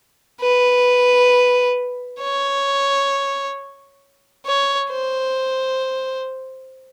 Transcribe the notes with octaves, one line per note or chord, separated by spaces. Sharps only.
B4
C#5
C#5
C5